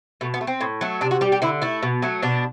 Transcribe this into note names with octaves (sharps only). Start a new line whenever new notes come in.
B2 A3
B3
A3
C4
A2
F#3 A3
C3 D4
F#4
G3 G4
G4
D3 E4
A3 E4
B2
F#3 A3
B2 D4